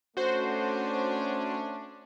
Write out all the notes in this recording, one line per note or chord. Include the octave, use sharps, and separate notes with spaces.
A3 C#4 D4 F#4 C5